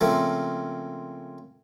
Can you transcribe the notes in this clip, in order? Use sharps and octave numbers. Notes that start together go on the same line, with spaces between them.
C#3 F3 A3 A#3 C4